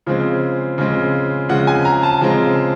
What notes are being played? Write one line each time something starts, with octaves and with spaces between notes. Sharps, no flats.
C#3 F3 G#3 C4
C#3 F3 G#3 C4
C#3 F3 G#3 C4 F#5
G#5
A#5
A5
C#3 F3 G#3 C4